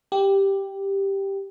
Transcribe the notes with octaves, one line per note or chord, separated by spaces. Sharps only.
G4